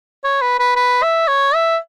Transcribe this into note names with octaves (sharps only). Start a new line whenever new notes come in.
C#5
B4
B4
B4
E5
C#5
E5